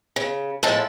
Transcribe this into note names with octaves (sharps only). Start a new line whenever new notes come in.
C#3
A2 F3 G#3 E4 A5